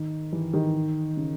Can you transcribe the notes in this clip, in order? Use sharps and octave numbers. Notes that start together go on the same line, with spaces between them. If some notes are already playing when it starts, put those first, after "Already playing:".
Already playing: D#3
E3
D#3
C#3